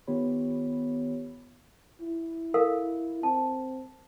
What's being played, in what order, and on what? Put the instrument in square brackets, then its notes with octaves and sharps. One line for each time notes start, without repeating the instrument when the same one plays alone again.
[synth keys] D#3 B3 F4 G4 C#5 B5
[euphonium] E4
[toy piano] A4 A#4 F5
[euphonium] C4 [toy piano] A5